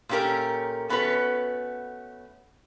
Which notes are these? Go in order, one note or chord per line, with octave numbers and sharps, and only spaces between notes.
A#2 A3 C#4 G4 A#4
A3 B3 C#4 F#4 B4